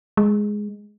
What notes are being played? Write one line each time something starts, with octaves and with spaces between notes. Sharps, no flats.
G#3